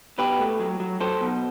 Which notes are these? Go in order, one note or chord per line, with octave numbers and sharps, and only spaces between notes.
B2 G4 B4
A3
F#3
F#3
F#3 A4 C5
B2